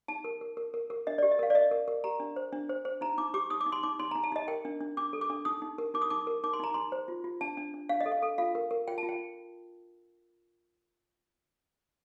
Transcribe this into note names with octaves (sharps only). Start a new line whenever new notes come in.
D#4 A5
A#4
A#4
A#4
A#4
A#4
D4 D#5
G4 D5
D#5
A#4 F5
D5
A#4 D#5
A#4
A#4
G4 A#5
D4
C5
D4
C5
C5
D#4 A#5
D#4 D6
G4 D6
D#4 D#6
D6
D#4
C6
D#4 D6
D#4 C6
D#4 A#5
A5
D#4 D#5
A#4 G5
D4
D4
D4 D6
A4
D6
D4
D#4 D#6
D#4
A#4
D#4 D6
D#6
D#4 D6
A#4
D#4 D6
C6
D#4 A#5
D#4 C6
C5
F4
F4
D4 A5
D4
D4
D4 F5
D#5
A4
F5
A4
F4 F5
A#4
A#4
F4 G5
A5
F4
G5